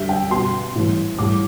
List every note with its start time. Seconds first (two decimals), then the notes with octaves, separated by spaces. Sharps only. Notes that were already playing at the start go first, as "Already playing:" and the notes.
Already playing: G2 D3 G3 E5
0.09 G5
0.31 B2 G3 C6
0.75 A2 E3 G3
1.19 A2 G3 D6